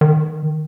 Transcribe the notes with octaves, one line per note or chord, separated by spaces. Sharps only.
D#3